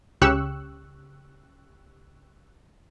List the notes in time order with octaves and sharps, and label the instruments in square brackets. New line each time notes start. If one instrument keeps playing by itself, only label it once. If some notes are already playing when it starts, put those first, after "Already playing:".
[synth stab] C#2 C#3 G4 C#6 E6 F#6